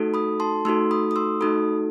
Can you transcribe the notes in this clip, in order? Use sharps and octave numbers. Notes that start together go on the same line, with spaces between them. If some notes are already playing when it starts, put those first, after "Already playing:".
Already playing: A3 D#4 F#4 A4
B5 D#6
A5 C6
A3 D#4 F#4 A4 C6 E6
B5 D#6
D#6
C6 E6
A3 D#4 F#4 A4 B5 D#6